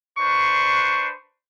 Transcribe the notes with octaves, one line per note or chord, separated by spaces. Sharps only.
D4 B4 C5 C#6